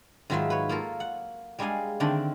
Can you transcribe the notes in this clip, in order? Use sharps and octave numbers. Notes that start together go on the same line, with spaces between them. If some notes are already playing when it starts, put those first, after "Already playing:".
G#2 D#3 F#3 F4 B4 E5
B4 C#5
A#3 F4 A4 A#4
F#5
G3 G#3 D4 G#4 F5 G#5
D3 D#3 A3 C4 D4